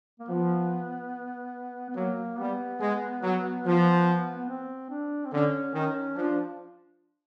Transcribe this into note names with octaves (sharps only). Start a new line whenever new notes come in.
A#3
F3 B3
B3
F#3 A#3
G3 B3
G#3
F#3
F3
B3
C4
D4
C4
D3 C#4
D#3 C#4
F3 D4